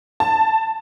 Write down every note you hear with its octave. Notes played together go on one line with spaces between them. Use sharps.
A5